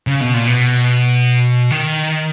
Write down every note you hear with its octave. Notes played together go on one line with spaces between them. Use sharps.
C#3
B2
A#2
B2
D#3